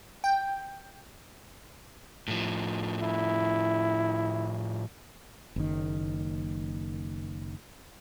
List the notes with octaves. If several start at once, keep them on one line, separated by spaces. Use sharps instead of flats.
G5
A2 F3
E4
F#1 D#3